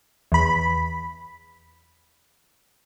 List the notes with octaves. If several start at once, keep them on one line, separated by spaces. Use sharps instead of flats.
E2 B5